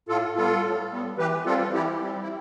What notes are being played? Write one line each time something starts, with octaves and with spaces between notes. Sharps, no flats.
A2 F4 A4
G3 B3 F4 A4
A2
G3 B3
E3 G4 B4
G3 C4 F4 A4
E3 E4 G4
G3 C4
E4